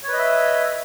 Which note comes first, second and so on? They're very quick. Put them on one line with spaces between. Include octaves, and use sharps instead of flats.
C#5 B4 D#5 E5